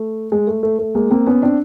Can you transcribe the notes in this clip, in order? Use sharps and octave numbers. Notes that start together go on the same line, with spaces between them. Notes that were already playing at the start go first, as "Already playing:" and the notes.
Already playing: A3
G#3
A3
A3
A3
G#3 A#3
A#3 C4
B3 C#4
C4 D4